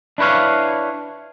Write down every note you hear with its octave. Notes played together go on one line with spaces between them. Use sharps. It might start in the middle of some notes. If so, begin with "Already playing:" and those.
D4 E4 B4 C#5 F5